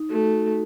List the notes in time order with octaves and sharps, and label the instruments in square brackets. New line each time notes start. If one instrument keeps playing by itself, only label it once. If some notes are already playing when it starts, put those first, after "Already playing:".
Already playing: [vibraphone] D#4
[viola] A3 [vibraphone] F#4